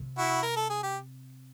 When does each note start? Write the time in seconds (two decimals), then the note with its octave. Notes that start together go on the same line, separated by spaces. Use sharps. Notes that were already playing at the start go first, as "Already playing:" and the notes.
Already playing: C3
0.18 E4 F#4
0.42 A#4
0.56 A4
0.70 G#4
0.83 G4